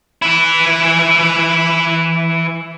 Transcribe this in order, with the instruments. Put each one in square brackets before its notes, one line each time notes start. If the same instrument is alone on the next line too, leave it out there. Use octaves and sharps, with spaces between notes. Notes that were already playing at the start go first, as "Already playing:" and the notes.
[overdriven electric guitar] E3 E4